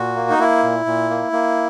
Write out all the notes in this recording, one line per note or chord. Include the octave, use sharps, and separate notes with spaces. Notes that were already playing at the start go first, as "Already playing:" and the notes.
Already playing: A#2 F#4
A#3
D#4
A#3 E4
A#2
A#2
A#3
A#3